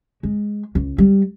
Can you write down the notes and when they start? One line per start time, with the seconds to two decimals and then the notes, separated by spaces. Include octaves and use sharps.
0.23 G#3
0.75 C#2
0.98 G3